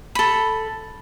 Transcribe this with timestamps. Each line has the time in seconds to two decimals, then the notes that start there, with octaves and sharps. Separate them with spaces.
0.15 A4 B5